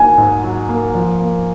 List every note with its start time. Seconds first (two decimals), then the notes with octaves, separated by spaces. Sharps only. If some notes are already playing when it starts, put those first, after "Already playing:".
Already playing: F#3 A#3 D#4 G#5
0.18 G#2
0.43 F#3
0.69 A#3
0.94 F3
1.19 A#3